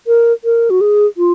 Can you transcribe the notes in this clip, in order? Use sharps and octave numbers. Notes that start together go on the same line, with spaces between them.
A#4
A#4
F#4
G#4
F4